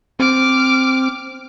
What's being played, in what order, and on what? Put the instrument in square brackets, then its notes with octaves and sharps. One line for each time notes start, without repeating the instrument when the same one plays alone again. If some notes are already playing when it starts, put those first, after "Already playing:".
[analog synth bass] C4 [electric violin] D6 F6